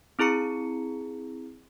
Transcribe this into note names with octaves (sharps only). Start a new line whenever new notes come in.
C4 E4 G#4 A#5 C#7